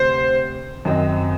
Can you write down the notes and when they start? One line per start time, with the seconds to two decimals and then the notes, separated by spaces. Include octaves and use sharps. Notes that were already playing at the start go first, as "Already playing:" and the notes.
Already playing: D2 C3 C5
0.85 F#2 D#3 F#3 C4 D#4